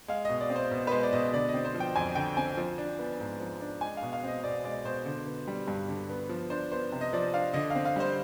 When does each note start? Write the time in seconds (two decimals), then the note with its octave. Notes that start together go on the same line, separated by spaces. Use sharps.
0.08 G#3 F5
0.25 B2 D#5
0.40 D5
0.50 C4
0.56 C5
0.71 B2
0.87 B4
0.91 G#3 C5
1.03 D5
1.13 B2 D#5
1.33 D3 D5
1.48 D#5
1.54 C4
1.65 C5
1.74 F3
1.80 G5
1.96 F2 G#5
2.15 D3 G5
2.37 C4 G#5
2.57 F3
2.78 D4
2.99 B3
3.20 G#2
3.40 F3
3.61 D4
3.81 G#3 G#5
3.97 F5
4.02 B2
4.13 F5
4.24 C4 D#5
4.43 B2 D5
4.64 G#3 D5
4.85 B2 C5
5.05 D3
5.27 B3
5.47 G3
5.68 G2
5.88 D3
6.10 B3
6.29 F3
6.50 D4 C5
6.71 B3 C5
6.92 C3
7.01 D#5
7.13 F3 D5
7.34 D4 F5
7.54 D3 D#5
7.70 C4 F5
7.85 F5
7.96 G3 C5